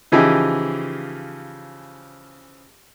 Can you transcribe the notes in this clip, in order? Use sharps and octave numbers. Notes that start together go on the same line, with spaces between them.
C#3 E3 F3 D#4 G4 G#4